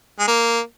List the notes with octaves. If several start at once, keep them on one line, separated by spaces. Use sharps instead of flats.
G#3
A#3